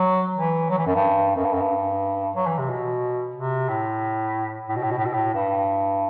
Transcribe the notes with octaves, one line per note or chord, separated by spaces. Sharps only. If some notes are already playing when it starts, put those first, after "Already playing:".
Already playing: F#3
E3
F#3
E3
F#2
G2
F#2
G2
F#2
G2
F#3
E3
C3
B2
C3
A2
A2
B2
A2
B2
A2
B2
A2
G2